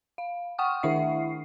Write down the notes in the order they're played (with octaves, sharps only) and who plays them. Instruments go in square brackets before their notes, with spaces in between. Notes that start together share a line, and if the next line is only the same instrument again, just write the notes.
[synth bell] F5
F#5 G5 C#6 D#6 F6
D#3 D4 E4 E5 F#5 C7